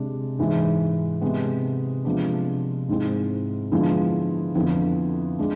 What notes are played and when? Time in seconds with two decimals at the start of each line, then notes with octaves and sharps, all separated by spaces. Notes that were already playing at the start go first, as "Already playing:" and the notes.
Already playing: C3 G#3 D4
0.39 G#2 E3 G#3
1.21 C3 G#3 B3
2.05 C3 F3 G#3 B3 D4
2.89 G#2 G#3 C4 E4
3.72 D3 F3 G#3 B3 E4
4.55 F2 D3 F3 B3 E4
5.39 G#3 D4